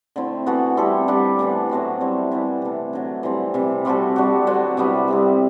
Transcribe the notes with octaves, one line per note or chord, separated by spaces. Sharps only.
D3 A3 C4 E4
E3 B3 F#4 A4
G3 C4 E4 A4
D3 G3 D4
A2 E3 B3
F#3 A3 C4 F#4
G3 C4 E4
E3 G3 B3 E4
C3 E3 A3
D3 F#3 A3
E3 G3 C4
C3 E3 G3
G3 C4 F#4 A4
G3 D4 F#4
D3 F#3 C4 F#4
C3 G3 B3 E4
G3 C4 E4